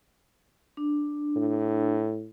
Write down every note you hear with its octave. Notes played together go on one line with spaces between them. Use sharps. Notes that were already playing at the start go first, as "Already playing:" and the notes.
D4
A2